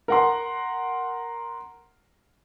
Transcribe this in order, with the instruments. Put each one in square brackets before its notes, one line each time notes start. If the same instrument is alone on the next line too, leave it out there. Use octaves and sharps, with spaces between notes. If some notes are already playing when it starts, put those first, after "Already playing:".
[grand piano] A#4 F#5 C6